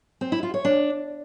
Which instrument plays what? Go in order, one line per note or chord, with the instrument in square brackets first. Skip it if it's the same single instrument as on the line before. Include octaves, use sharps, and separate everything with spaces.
[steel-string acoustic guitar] C4
E4
F4
C#5
D4